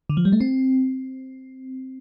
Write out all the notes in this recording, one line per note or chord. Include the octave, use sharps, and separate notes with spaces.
D3
F3
G3
A3
C4